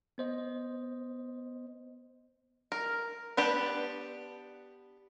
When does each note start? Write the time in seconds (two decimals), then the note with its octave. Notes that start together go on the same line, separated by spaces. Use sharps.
0.18 B3 C5 D#5
2.72 A#4
3.37 B3 D4 G4 B4